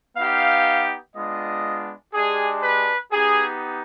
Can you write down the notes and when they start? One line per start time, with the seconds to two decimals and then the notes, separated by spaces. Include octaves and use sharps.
0.16 B3 D#4 G4 F5
1.15 G#3 B3 D4 F4 D#5
2.13 G#3 D4 G4 G#4
2.63 B4
3.11 B3 D#4 G4 G#4